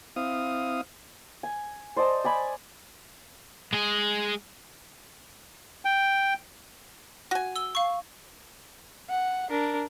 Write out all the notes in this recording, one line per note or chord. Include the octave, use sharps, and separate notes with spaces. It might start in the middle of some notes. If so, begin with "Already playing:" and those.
C4 E4 F5 D#6
G#5
C5 D5 D#5 A5
D5 G#5 B5
G#3 G#4
G5
F#4 G#5
E6 G7
F5 C#6
F#5
D4 A#4